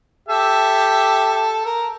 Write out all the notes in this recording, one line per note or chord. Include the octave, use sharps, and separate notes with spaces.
G4 A4 E5
A#4